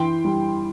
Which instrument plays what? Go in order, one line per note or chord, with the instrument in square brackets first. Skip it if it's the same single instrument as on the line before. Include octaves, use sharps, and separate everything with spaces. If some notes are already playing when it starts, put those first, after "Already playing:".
Already playing: [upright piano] E3 G5 C6
G3